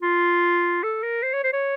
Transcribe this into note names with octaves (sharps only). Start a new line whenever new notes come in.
F4
A4
A#4
C5
C#5
C5
C#5